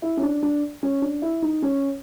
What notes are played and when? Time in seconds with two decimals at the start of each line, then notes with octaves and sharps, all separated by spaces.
0.02 E4
0.17 C#4
0.22 D4
0.43 D4
0.83 C#4
1.02 D4
1.22 E4
1.42 D#4
1.62 C#4